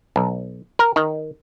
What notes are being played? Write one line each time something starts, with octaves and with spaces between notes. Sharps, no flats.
B1
A#4
D#3